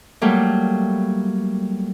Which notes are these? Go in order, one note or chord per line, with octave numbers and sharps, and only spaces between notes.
F#3 G3 A3 A#3